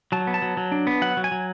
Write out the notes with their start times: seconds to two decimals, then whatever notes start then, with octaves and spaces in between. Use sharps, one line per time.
0.12 F#3 A5
0.27 B3
0.34 A5
0.42 F#3
0.57 F#3
0.72 D4
0.87 B3
1.01 F#3 F#5
1.17 F#3
1.24 G#5
1.31 F#3